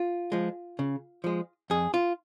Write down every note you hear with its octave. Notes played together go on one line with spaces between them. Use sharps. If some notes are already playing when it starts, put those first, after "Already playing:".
Already playing: F4
F3 G#3
C#3
F3 G#3
F2 G#4
F4